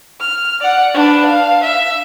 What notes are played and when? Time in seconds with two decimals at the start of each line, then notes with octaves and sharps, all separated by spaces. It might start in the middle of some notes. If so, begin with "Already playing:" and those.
0.21 F6
0.61 D5 F#5
0.94 D4 B4
1.26 F5
1.63 E5